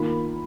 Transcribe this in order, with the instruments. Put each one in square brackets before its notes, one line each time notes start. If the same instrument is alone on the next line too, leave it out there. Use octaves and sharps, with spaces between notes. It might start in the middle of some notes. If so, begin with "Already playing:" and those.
Already playing: [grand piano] D#3 A#3 F4 B5